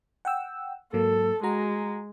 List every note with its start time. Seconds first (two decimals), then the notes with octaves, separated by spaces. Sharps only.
0.25 F#5 G5 E6
0.93 G#2 F#3 A#3 A4
1.43 G#3 F#4 A#5